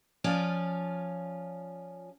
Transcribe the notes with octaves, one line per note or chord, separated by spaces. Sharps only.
F3 C#4 F4 D5